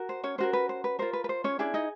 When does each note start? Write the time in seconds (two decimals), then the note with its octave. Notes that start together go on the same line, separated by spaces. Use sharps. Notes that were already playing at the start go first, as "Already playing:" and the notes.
Already playing: F#4 A#4
0.09 C5
0.24 C#4 C#5
0.38 C#4 F#4 A#4 C5
0.53 B4
0.69 C5
0.84 B4
0.99 F4 A#4 C5
1.13 B4
1.24 B4
1.29 C5
1.44 C#4 C#5
1.59 C#4 D4 E4 G#4 D5
1.74 D#4 D#5